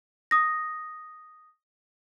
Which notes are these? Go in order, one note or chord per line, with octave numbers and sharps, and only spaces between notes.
D#6 A#6